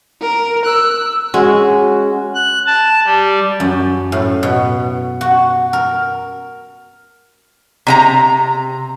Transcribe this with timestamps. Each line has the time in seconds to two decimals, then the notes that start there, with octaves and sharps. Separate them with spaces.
0.22 A#4
0.66 E6 F#6
1.34 G#3 C#4 F#4
2.34 F#6
2.66 A5
3.05 G3
3.60 F#2
4.12 A2
4.43 B2
5.21 F#4
5.73 A#4
7.87 C3 D4 A#5